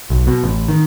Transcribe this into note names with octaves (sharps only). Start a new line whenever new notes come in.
B1
B2
A1
D#3